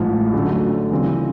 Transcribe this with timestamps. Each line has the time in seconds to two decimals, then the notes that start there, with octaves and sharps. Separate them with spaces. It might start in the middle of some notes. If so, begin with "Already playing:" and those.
Already playing: A1 G#2 F3
0.33 D2 D3 F#3 A3 C#4
0.91 C#3 E3 G3 C4 F4